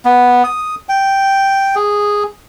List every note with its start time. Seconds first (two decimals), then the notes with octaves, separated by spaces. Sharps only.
0.05 B3
0.44 D#6
0.89 G5
1.75 G#4